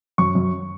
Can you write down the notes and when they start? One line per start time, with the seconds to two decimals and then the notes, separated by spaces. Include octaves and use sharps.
0.18 F#2 C#6
0.35 F#2